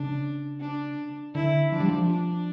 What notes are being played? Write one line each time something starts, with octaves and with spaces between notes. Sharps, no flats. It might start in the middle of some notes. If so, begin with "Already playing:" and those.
Already playing: C#3 D4
D4
D3 E4
F3 D4
G3
F3
D4